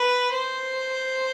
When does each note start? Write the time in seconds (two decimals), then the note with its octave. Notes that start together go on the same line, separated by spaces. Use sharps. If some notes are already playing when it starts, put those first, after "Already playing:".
Already playing: B4
0.33 C5